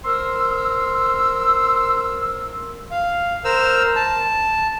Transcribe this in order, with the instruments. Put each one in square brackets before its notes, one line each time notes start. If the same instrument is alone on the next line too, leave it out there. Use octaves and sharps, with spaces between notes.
[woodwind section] A#4 C5 C6 E6
[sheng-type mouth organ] F5
A#4 C5 E6 F6
A5